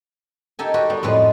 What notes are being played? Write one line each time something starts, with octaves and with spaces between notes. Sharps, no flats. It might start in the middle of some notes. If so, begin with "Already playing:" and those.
D#4 G4 A4 G#5
F#4 G4 B4 F#5
G3 B3
F2 A2 F3 G#3 B4